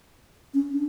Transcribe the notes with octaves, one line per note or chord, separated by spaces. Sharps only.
C#4
D4